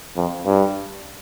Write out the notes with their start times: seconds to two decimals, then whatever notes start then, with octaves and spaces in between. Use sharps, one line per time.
0.16 F2
0.46 G2